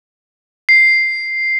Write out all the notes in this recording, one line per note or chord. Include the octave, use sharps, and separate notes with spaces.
C7